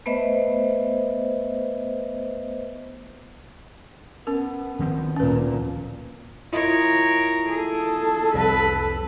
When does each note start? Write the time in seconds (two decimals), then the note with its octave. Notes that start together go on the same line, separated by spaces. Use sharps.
0.06 A3 B3 B4 C5 D#5 E5
4.27 B3 C#4 A#4
4.79 D#3 F3 C4
5.16 D2 A#2 C#4 B4
6.53 E4 F4 A#4 C#5 D#5
7.49 G#4 A4
8.34 C2 F2 B4